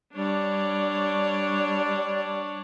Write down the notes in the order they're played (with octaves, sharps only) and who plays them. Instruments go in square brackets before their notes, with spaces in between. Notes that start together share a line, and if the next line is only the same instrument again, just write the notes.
[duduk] G3 [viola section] D4 C#5